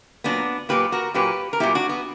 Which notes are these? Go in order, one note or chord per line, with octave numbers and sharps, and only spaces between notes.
A#2 F#3 A#3 B3 D4
A#2 F#3 A#3 G4 B4
F#4 A#4
A#2 F#3 A#3 G4 B4
A#4
A#2 F#3 A#3 E4 G4
D4 F#4
B3